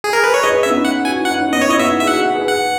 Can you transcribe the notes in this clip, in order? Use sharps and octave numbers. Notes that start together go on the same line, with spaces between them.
G#4
A#4
B4
C#5
G#4 B4 D#5
E5
C#4
B3 D#4
F#5
F#4 G#5
E4
F#5
D#4
C#4
B3 D#5
C#5
E4 D#5
B3 D#4 E5
G#4 E5
D#4 F#4 F#5
G#4 B4
F#5